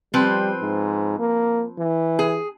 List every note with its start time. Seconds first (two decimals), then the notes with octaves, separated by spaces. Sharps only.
0.14 F3 G3 C4 B4
0.61 G#2
1.19 A#3
1.78 E3
2.19 G#4